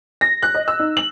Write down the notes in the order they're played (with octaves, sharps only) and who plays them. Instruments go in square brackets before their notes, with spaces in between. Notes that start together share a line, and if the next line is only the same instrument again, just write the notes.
[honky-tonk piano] A#6
F#6
D#5
E6
D#4
F#7